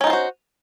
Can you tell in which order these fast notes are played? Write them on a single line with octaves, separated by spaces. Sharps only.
C#4 D#4 F4 C5 F#4